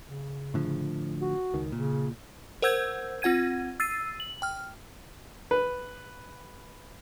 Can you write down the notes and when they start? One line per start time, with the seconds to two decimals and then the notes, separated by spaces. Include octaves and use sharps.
0.04 C#3
0.54 A2 D3 F3
1.21 F#4
1.54 C#2 D#3
1.72 A#2 C#3
2.62 A#4 C5 F#5 E6 G6 G#6
3.22 C4 F4 F#5 G#6 D#7
3.80 E6 A6 C7 D#7
4.20 F#7
4.42 G5 F6
5.51 B4